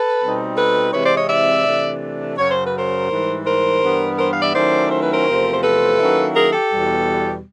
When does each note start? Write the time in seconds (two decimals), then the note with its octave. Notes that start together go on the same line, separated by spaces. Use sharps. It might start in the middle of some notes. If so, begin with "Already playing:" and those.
Already playing: A4 B4
0.20 B2 G3 C4 D#4
0.56 A4 B4
0.93 C3 E3 G#3 C4 E4 B4 C#5
1.05 C5 D5
1.17 C#5 D#5
1.29 D5 E5
1.65 C3 E3 A3 D4
2.38 F#2 C#3 F#3 C#5
2.51 C5
2.65 B4
2.78 A#4 C5
3.10 G#2 E3 G3
3.46 A#4 C5
3.82 G2 E3 G3 B3
4.18 A#4 C5
4.33 F5
4.42 D5 E5
4.54 D#3 F#3 A3 C#4 E4 C5 D5
4.91 C5
5.02 B4
5.14 A#4 C5
5.26 E2 C3 F3 A3 C4
5.53 C5
5.63 A4 B4
5.99 D#3 F#3 A#3 C#4 E4
6.35 G#4 A#4
6.53 G4 A4
6.71 E2 B2 G3